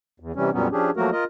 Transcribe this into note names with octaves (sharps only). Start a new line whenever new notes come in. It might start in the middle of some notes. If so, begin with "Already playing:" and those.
E2
C3 E3 G3 C#4
F2 A#2 F#3 G3 B3 C#4
F3 C#4 D4 G4 G#4
F3 F#3 A3 A#3 F#4 A#4
F4 A#4 D#5